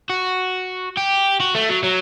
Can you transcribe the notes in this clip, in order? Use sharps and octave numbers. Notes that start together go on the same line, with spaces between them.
F#4
G4
F#4
A3
F#3
F#3